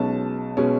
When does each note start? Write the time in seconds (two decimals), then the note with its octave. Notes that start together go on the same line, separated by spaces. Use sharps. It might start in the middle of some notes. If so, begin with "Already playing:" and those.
Already playing: B1 B2 G#3 C#4 A5
0.57 B2 G#3 C#4